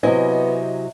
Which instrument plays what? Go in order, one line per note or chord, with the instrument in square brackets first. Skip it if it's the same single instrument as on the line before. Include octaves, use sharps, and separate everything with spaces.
[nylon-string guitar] C3 F#3 E4 [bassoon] B3 [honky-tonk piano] C4 D#5 G#5